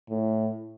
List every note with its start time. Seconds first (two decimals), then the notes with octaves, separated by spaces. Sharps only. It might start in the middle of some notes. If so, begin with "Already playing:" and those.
0.09 A2